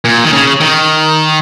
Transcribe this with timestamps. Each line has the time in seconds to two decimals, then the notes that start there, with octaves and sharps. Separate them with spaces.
0.05 A#2
0.24 D#3
0.33 C#3
0.60 D#3